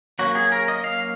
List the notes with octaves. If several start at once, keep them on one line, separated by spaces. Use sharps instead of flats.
F#3 A#3 C#4 F#4
G#4
A#4
D#5
F5